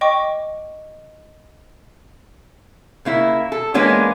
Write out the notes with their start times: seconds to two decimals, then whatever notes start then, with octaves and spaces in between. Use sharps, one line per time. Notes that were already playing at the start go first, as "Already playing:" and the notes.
0.01 D#5 G5 C#6 D6
3.05 C#3 A#3 E4
3.52 A4
3.74 E3 G#3 A#3 B3 C#4 D4